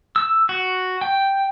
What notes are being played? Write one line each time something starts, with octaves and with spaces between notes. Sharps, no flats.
E6
F#4
G5